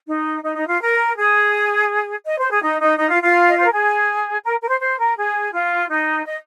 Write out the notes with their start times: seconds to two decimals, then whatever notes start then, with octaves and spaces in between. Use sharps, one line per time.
0.08 D#4
0.43 D#4
0.56 D#4
0.67 F4
0.81 A#4
1.16 G#4
2.25 D#5
2.38 C5
2.50 G#4
2.62 D#4
2.81 D#4
2.98 D#4
3.11 F4
3.22 F4
3.49 D#5
3.57 C5
3.65 A#4
3.71 G#4
4.44 A#4
4.61 A#4
4.68 C5
4.81 C5
4.98 A#4
5.17 G#4
5.53 F4
5.90 D#4
6.26 D#5